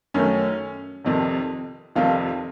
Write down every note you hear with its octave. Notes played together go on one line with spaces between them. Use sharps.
F#2 D#3 A3 C#4
F1 F2 C3 D#3
F1 F2 C3 D#3 F4